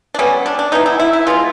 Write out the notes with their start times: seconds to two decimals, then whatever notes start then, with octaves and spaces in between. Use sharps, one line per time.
0.14 D4
0.19 D3 G3 B3 C#4
0.46 D4
0.59 D4
0.72 E3 G3 B3 D#4
0.86 E4
1.00 E4
1.13 E4
1.27 B2 G#3 B3 F4